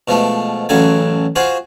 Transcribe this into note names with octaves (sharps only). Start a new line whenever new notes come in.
B2 F3 G#3 A3
A1 F#2 C#3 F#4 A4 G#5
F4 F#4 G#4 C5